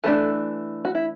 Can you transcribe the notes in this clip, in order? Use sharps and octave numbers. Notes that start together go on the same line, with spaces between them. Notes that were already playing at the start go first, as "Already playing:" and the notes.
E3 A3 D4 A4
F#4
E4